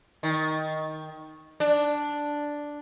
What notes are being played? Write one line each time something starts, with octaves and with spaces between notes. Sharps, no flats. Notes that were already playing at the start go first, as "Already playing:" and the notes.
D#3
D4